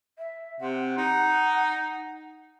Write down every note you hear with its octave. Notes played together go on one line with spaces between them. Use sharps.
E5
C3 F#5
D#4